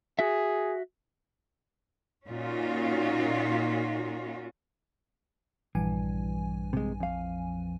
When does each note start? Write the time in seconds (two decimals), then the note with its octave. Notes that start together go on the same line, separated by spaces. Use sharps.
0.19 F#4 G#4 E5
2.28 A#2 C#4 D#4 F4 F#4
5.75 A#1 G2 E3 G#5
6.73 C3 G#3
7.00 F2 F5